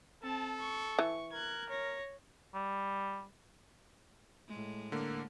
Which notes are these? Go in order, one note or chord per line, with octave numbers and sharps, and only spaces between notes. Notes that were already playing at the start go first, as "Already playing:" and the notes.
C4 A4 A5
C#6
E3
A#4 F#6 G#6
C#5 A#6
G3
A2 G#3
D3 A#3